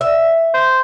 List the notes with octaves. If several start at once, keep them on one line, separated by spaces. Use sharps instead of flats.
E5
C5